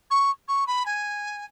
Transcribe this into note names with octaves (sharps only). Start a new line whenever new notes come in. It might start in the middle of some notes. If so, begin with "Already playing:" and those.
C#6
C#6
B5
G#5